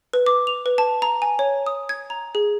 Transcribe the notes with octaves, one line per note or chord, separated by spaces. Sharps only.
B4
D6
F7
B4
A5
A#5
G#5
C#5
D#6
G#6
A#5
G#4